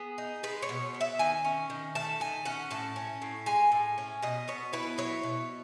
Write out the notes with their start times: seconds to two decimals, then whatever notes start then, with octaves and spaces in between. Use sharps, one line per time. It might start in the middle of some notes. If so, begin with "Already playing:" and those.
Already playing: B3 G#4
0.18 D#4
0.43 G#3 B4
0.62 C#5
0.69 B2
0.94 B3
1.01 E5
1.19 D#3 G#5
1.45 C#4
1.70 D#3
1.95 A3 A5
2.20 D#3 G#5
2.45 C#4 F#5
2.71 A2 A5
2.96 C#4
3.22 A2
3.46 G#3 G#5
3.72 A2
3.98 C#4
4.22 B2 D#5
4.48 B3 C#5
4.73 E4 B4
4.98 F#3 C#5
5.23 B2